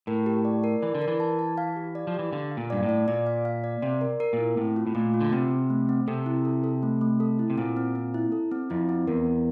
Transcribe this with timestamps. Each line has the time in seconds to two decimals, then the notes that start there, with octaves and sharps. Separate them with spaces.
0.07 A2 A#4
0.26 G4
0.45 D5
0.64 A#4
0.82 E3 D5
0.95 D3
1.02 A#4
1.08 E3
1.20 A5
1.39 A5
1.58 F5
1.76 G4
1.95 D5
2.07 F3
2.14 E3 G4
2.33 D3 F5
2.51 F5
2.57 A#2
2.70 G2 D5
2.83 A2
2.89 D5
3.08 A#2 D5
3.26 F5
3.45 F5
3.64 D5
3.82 C3 D5
4.01 A#4
4.20 A#4
4.33 A#2
4.39 E4
4.57 A2 C4
4.76 F4
4.87 A2
4.95 A#2 A3
5.14 F4
5.21 D3
5.32 C3 C4
5.51 C4
5.70 A3
5.89 C4
6.07 C3 A4
6.26 E4
6.45 A4
6.64 A4
6.83 A3
7.01 A3
7.20 A4
7.39 E4
7.50 C3
7.58 A#2 C4
7.77 C4
7.95 C4
8.14 E4
8.32 A4
8.51 C4
8.70 F2 E4
8.89 C4
9.07 E2 A#4
9.26 A#4